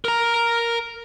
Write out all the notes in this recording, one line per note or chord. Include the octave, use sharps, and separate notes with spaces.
A#4 A#5